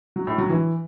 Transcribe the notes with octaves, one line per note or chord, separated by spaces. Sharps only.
F#3
A2
F#3
E3